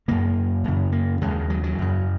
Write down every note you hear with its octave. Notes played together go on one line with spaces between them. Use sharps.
F#2 C#3 A#3
F#2 C#3
A#3
D#2 C#3 G#3
F#3
F#3
F#2 C#3